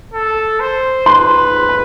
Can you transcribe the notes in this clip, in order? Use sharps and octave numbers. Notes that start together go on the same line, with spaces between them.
A4
C5
B4 C6
C6
B5